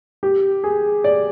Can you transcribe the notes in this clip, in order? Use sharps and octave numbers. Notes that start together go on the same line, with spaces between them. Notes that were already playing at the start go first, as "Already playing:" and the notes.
G4
G#4
D5